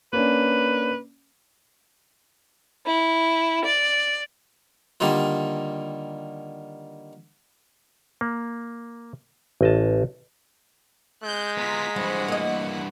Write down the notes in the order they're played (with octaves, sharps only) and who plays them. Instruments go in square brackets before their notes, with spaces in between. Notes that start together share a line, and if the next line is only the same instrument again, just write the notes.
[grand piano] A#3 C#4 D4 [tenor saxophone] B4
[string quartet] E4
D5
[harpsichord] D3 D#3 G3 A#3 F4
[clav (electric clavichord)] A#3
A1 D#5 A5
[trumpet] G#3 [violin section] F#6 G6
[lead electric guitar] B3 F4 [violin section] A#5 B6
[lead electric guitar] G2 E3 [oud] F3 [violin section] F#5 B5
[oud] A#3 D#5